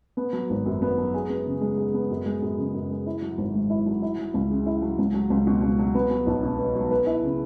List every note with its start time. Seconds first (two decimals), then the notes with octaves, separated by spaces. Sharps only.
0.17 B3
0.33 F#3
0.50 G#1
0.66 F#2
0.82 B3
0.98 F#3
1.14 G#4
1.29 B3
1.46 C#3
1.61 G#3
1.78 G#4
1.94 B3
2.10 F#2
2.26 G#3
2.42 F#2
2.58 C#3
2.74 F#2
2.90 G#3
3.07 E4
3.22 F#3
3.38 G#1
3.54 G#2
3.70 E4
3.86 F#3
4.02 E4
4.18 F#3
4.34 C#2
4.50 C#3
4.66 E4
4.82 F#3
4.98 C#2
5.14 F#3
5.30 C#2
5.47 B2
5.62 C#2
5.79 F#3
5.95 B3
6.11 F#3
6.27 B1
6.43 B2
6.58 B3
6.75 F#3
6.91 B4
7.07 E4
7.23 C#3